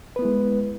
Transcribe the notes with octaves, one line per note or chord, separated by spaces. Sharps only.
G#3 B3 E4 B4